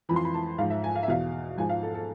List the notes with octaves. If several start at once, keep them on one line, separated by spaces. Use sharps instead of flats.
F2 E3 B5
C6
B5
A5
G#2 F3 F5
E5
G#5
F5
E5
E2 B2 F5
G#2 F3 G#5
F5
A4
A4